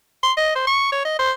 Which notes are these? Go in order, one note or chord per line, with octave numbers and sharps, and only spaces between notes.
C6
D#5
C5
C#6
C#5
D#5
C5